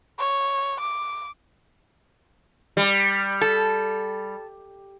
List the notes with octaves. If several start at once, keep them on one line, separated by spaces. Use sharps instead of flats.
C#5
D6
G3
A4